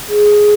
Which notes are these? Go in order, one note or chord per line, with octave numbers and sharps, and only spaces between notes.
G#4